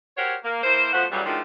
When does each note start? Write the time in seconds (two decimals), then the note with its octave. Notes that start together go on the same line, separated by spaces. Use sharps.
0.17 F#4 G4 A#4 C5 C#5
0.44 A#3
0.63 E3 A#3 A#4 C5
0.93 F3 A3 B3 F#4 C5 F#5
1.11 A2 C#3 E3 F#3 G3
1.25 D#3 F3 F#3 G#3 A3 D4